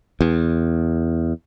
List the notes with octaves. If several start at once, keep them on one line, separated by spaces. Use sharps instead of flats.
E2